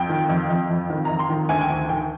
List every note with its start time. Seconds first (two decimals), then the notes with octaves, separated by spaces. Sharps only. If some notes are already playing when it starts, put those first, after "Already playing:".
Already playing: F2 G5
0.09 D#3
0.29 F2
0.50 F2
0.70 F2
0.90 D#3
1.05 F2 A#5
1.19 C6
1.30 D#3
1.49 D2 G#5
1.61 G5
1.69 D#3 G#5
1.89 D#3 G5